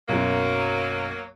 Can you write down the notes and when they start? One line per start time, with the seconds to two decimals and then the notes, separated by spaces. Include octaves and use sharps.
0.09 B1 F#2 F#3 A#3